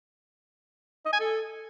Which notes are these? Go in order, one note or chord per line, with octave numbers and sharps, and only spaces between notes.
D#5
G#5
A4